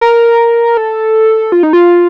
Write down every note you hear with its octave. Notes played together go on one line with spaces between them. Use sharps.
A#4
A4
F4
D#4
F4